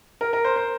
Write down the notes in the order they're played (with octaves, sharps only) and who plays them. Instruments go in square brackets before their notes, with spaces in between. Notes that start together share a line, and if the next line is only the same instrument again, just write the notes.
[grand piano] A#4
A#4
C5
C5